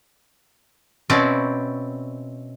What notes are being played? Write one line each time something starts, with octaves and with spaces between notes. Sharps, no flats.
B2 C4 C#4 E4 D5